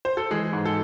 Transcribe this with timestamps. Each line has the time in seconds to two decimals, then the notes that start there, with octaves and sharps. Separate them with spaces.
0.05 C5
0.17 A4
0.31 E3 G#3 G#4
0.53 G#2
0.65 A4